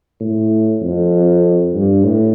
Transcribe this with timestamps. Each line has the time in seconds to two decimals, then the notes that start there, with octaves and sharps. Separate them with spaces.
0.21 A2
0.82 F2
1.74 G2
2.04 A2